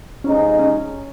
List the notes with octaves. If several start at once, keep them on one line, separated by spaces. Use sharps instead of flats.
C3 F3 G#3 C#4 D#4 G#4
C#4